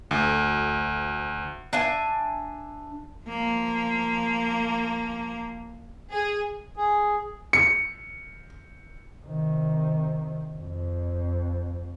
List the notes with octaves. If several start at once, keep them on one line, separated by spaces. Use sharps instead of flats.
D2
D4 E5 G#5
F3 A#3
G#4
G#4
C#7
C3 D#3
F2